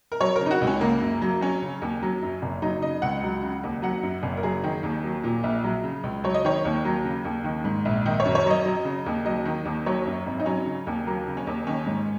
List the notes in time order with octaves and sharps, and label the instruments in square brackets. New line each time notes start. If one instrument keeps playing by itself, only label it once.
[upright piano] A#4
F#3 C#5
A#4
C#3
D#4
F#4
C#2
C#4
C#3 A#3
F#2
F#3
F#3 C#4
C#3
D#2
F#3
F#2
F#1
F#3 D#4
C#3 D#5
C#2 F#5
F#3
C#3
D#2
F#3 F#5
F#2
F#1
A#4
F#3 G#4
D#3
D#2
F#3
A#2
A#1
F#3
C#3
C#2
F#3 C#5
D#5
D#3 C#5
D#2
F#3
C#3
D#2
D#3
G#2
A#1
D#3 D#4
C#5
F#2
C#5
F#3 D#5
F#3
C#3
D#2
F#3 D#5
D#3
D#2
F#3 C#5
F#2
G#1
D#4
F#3 C#4
C#3
D#2
F#3 A#3
C#3
C#4
D#2
D#3 C#4
G#2